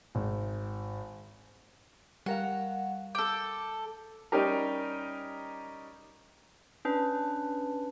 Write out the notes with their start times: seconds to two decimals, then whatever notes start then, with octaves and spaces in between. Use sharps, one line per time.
0.15 G#1
2.26 G3 A#4 F5 F#5
3.15 A4 G5 D6
4.32 G3 C#4 D#4 G4 A#4
6.85 C#4 D4 B4